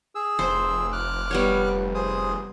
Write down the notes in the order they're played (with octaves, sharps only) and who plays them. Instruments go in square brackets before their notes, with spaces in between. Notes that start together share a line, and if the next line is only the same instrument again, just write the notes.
[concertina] G#4 E6
[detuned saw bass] F1 [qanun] C5
[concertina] D6 F6 F#6
[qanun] G3 B3 C#5
[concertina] G#4 C5 D#6